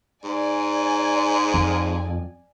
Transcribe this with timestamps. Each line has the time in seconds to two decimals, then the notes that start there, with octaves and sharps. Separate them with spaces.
0.24 G#2 D5 G#5
1.54 F2